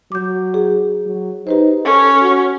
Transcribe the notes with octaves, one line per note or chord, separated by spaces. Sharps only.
F#3 D6 G6
G#4
F#3
D#4 G4 B4 C5
C#4 A4
F#4